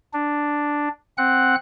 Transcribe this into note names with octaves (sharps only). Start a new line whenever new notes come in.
D4
C4 F#5 F#6